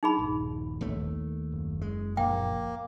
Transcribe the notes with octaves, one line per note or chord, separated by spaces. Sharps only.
D#4 G#4 B5
D#1 A#1
D#2 A3
F#1
G#3
A#1 A#3 G5